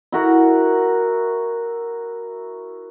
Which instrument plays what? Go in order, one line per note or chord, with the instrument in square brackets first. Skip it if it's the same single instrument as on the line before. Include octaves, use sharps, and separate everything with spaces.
[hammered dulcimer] E4 F#4 A#4